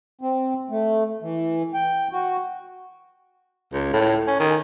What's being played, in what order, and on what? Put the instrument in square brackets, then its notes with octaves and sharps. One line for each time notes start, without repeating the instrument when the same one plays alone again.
[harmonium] C4
A3
E3
G5
F#4
[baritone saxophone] C#2
A2
C#4
D#3